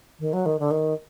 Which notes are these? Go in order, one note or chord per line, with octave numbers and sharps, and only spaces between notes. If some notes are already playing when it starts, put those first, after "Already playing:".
D#3
F#3
D#3
D3
D#3